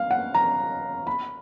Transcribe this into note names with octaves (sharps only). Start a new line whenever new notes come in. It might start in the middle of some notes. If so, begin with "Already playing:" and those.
Already playing: F5
F#5
A#5
B5